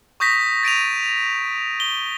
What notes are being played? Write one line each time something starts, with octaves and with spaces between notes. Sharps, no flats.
C#6 D#6 G6 A#6 B6
A6 D7 D#7 F7
G7